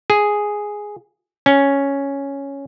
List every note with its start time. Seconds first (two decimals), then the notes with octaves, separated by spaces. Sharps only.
0.10 G#4
1.46 C#4